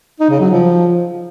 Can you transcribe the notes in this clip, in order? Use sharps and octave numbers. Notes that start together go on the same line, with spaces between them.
D#4
C#3
F#3
F3